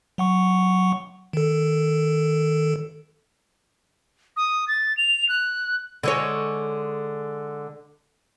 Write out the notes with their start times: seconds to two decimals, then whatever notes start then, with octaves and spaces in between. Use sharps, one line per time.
0.18 F#3 F#5 C#6
1.33 D#3 A4
4.37 D#6
4.68 A6
4.97 F7
5.29 F#6
6.03 D3 G#3 C#5